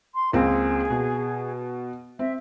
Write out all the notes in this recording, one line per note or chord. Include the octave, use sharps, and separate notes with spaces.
C6
C#2 A#3 C4 G#4
B2
C4 E5